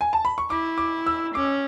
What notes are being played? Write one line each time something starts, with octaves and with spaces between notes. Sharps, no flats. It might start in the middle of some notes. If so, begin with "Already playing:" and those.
G#5
A5
B5
C#6
E4 D6
D6
E6
C#4 D6